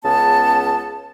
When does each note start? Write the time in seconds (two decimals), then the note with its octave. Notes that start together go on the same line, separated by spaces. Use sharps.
0.04 C#2 C#3 B3 A5